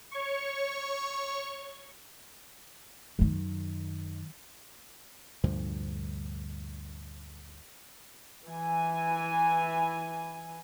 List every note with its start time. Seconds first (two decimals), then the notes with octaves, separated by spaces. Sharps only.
0.11 C#5 C#6
3.19 F#2 D#3
5.44 D2 G2 A#2 F3
8.47 E3 G#5